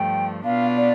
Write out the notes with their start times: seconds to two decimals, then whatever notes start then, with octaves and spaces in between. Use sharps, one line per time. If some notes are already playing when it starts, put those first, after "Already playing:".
Already playing: G2 F3 A3 G5
0.45 B2 B3 D4 F4 F5
0.77 D5